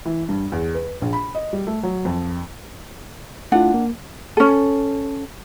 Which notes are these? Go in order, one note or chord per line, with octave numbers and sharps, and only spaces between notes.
E3
G2
E2
B4
A#1
B5
D#5
G3
A3
F#3
F2
A3 D4 E4 F4 F#5
A#3
C#4 A4